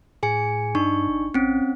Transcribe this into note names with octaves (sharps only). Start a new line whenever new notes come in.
A2 G#4 G#5 C#7
G2 D4 D#4 C#6
G#1
G#1 C4 C#4